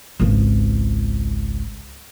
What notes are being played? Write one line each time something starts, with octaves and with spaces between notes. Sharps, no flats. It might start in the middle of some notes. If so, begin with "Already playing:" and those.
G#1 C#2